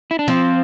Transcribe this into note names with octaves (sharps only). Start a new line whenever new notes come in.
E4
D4
F3 C4